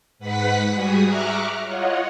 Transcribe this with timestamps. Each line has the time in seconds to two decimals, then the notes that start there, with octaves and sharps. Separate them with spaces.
0.19 G#2 B4 F#5 B6
0.73 G3 F#4 G#4 D#6
1.06 E5 A#5 C#6 D6 F6 F#6
1.63 F4 C#5 D#5 F#5